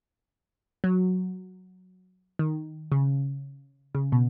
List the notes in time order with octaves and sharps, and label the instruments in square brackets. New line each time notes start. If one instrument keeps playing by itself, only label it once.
[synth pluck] F#3
D#3
C#3
C#3
B2